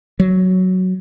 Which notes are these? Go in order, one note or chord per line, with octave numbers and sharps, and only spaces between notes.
F#3